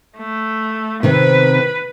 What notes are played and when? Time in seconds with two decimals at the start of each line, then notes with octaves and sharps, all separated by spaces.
0.18 A3
1.03 C3 D#3 C4 B4